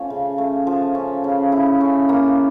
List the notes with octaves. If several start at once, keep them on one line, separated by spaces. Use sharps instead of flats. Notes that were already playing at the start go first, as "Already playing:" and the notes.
Already playing: F3 A3 C#4
C#3
A3
F3
C#4
C#3
E4
C#4
A#3